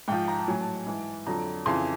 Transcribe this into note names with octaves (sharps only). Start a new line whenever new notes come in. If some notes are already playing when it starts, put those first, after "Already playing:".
G#2 F3 G5
A#5
A5
A2 F#3 G#5
A5
G#2 E3
F2 D3 F#3 A#5
F2 C#3 E3 C6